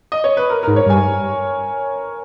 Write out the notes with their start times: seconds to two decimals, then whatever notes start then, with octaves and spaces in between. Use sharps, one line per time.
0.12 D#5
0.24 C#5
0.37 B4
0.50 A#4
0.63 A#4
0.67 G#2
0.76 C#5
0.86 G2 G#5